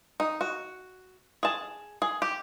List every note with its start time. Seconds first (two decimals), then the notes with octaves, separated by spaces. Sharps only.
0.20 D#4
0.41 F#4
1.43 G#4 A5
2.02 G#4
2.22 G4